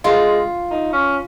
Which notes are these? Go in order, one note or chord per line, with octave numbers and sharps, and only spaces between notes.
G#3 F4
D#4
C#4